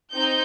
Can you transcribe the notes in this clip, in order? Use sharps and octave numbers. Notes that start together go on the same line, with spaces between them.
C4 D#4 G6